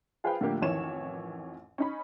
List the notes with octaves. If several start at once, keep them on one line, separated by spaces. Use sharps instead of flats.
F4 G#4 B4 C5 F5 G5
A2 D3 F3 A#3 G4
A1 F2 D#3 E3 C#5 E7
C#4 D#4 B5